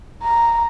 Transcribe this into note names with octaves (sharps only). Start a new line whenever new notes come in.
A#5